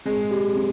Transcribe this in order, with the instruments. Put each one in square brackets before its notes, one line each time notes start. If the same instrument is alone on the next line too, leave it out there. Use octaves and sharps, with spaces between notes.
[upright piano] G#3 [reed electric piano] C4
[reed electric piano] G4
C4